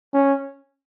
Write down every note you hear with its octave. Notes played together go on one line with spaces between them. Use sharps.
C#4